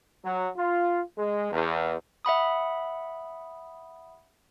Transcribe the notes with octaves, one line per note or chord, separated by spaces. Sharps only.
F#3
F4
G#3
E2
E5 F#5 B5 D#6